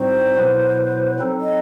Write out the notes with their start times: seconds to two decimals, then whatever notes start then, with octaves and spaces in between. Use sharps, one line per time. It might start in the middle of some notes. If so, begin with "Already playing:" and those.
Already playing: A2 G3 C4 D#4 F#4 C5
0.35 B2 F#3 B3 E4 B4
1.19 F#3 C4 D#4 A4
1.40 D#5